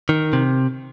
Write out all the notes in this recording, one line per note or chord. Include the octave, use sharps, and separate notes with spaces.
D#3
C3